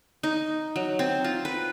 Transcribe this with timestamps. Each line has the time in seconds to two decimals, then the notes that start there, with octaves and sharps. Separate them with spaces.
0.23 D#4
0.76 F#3
0.99 C4
1.24 F4
1.45 B4